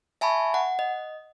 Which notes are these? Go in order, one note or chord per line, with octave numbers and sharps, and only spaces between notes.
E5 G#5 A5 B5 C#6
F#5
D#5